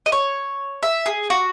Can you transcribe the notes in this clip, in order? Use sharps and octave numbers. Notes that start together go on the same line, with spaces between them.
D#5
C#5
E5
G#4
F#4